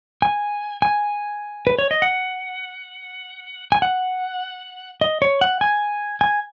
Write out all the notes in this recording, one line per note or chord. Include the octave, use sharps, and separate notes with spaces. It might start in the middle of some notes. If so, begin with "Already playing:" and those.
G#5
G#5
B4
C#5
D#5
F#5
G#5
F#5
D#5
C#5
F#5
G#5
G#5